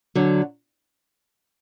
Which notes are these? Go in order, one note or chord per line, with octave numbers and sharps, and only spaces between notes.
D3 F#3